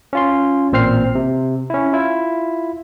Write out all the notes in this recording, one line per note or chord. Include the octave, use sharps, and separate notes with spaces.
C#4 F4 C6
A1 A#2 C4 C5 F6 C7
C3
C#4 E4
E4 F4